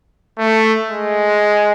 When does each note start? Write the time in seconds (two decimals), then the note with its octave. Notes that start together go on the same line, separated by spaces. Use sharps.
0.38 A3
0.89 G#3